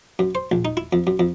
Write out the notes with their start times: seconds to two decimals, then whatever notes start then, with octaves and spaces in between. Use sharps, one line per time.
0.19 F#2
0.35 C5
0.52 A#1
0.65 D#4
0.77 E4
0.93 F2
1.07 F#2
1.19 F2